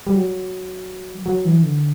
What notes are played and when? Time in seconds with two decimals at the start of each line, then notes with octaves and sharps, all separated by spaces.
0.07 G3
0.15 F#3
1.26 F#3
1.45 E3
1.63 D3